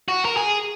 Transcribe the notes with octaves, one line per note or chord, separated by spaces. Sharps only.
F#4
A#4
G#4